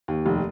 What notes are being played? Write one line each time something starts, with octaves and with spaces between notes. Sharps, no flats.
D#2
F1